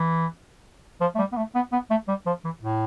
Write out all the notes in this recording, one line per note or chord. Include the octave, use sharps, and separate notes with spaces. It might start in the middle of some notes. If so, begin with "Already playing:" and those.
Already playing: E3
F3
A3
G3
B3
A3
B3
B3
A3
G3
F3
E3
A2